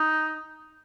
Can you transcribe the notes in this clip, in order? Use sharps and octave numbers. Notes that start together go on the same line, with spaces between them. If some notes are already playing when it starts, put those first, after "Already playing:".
Already playing: D#4